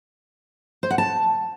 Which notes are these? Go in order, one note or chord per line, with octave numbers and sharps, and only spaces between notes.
C5
F#5
A5